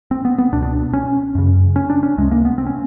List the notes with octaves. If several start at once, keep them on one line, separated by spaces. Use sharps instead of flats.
C4
B3
B3
C#2 B2 D4
D4
C#4
F#2 C#3
C#4
D4
C#4
C#2 C3 G#3
A#3
B3
C4
C#4